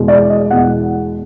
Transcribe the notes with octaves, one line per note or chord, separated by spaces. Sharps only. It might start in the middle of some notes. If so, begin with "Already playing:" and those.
Already playing: E2 B2 G#3
D5
D#5
E2 B2 G#3 F#5